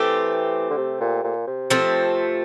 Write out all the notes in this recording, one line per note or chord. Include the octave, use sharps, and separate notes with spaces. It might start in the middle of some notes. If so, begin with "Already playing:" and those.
Already playing: E3 A3 C4 G4
D3
C3
A#2
A#2
C3
F3 A3 C4